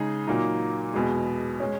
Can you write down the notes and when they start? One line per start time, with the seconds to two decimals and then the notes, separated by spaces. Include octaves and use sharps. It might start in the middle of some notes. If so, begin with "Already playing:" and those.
Already playing: C#3 G#3 D#4 G#4
0.27 A#2 F#3 A#3 D#4
0.94 E2 B2 G#3
1.60 G#3 C#4